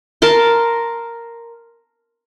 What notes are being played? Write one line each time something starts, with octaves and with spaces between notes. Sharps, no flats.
A#4 A5 C6